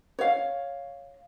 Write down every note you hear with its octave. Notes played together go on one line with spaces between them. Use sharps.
C#5 F5